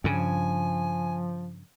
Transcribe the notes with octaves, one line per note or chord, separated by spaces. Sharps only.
G2 C#3 F3 G#5